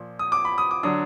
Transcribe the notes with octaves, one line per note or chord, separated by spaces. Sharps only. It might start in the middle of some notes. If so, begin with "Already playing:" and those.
Already playing: A#2 F3
D#6
D6
B5
D#6
D6
D3 F#3 D4 D#6